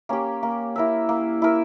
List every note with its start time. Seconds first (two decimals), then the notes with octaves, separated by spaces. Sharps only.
0.09 A#3 C#4 G4
0.43 A#3
0.76 E4 A#4 E5
1.09 A#3
1.42 E4 A#4 E5